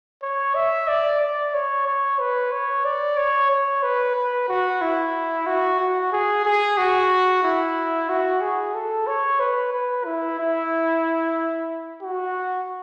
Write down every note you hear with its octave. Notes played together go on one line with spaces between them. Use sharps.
C#5
E5
D5
D5
C#5
C#5
B4
C#5
D5
C#5
C#5
B4
B4
F#4
E4
F#4
F#4
G#4
G#4
F#4
E4
F#4
G#4
A4
C#5
B4
B4
E4
E4
F#4